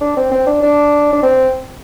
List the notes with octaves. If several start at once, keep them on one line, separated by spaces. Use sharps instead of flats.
D4
C4
C4
D4
D4
D4
C4